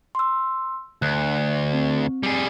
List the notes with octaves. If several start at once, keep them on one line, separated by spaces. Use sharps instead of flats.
C6 E6
D2 F#6
C4
G3 G#4